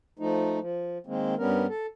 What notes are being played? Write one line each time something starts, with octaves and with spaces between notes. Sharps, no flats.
F3 A3 D#4
F3
D#3 G#3 A#3 C4
G2 G3 B3 C#4 A#4
A4